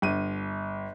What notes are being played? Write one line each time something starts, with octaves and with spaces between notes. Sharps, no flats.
G1 D#7